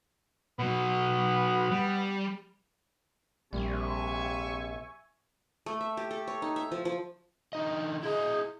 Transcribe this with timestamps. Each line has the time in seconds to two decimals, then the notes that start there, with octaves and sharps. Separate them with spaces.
0.59 B2 F#3 B3
1.71 G3
3.53 A#1 C3 G3 E5 G#5 C#6
5.66 A3
5.81 E5
5.97 G4
6.11 A4
6.28 C#5
6.42 D#4
6.56 E5
6.71 F3
6.85 F3
7.53 D3 D#4 D#5
8.03 E4 G#4 D#5